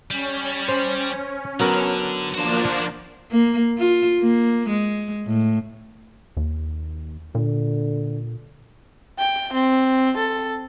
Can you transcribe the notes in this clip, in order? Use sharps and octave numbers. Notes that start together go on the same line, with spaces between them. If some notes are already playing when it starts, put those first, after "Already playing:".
G3 C#4
C5
D3 F#3 B3 A#4
F3 A#3 D4 F#4 C5
A#3
F4
A#3
G#3
A2
D#2
A#2 D3
G5
C4
A4